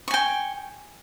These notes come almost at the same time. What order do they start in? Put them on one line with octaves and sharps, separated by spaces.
C#6 G#5 G5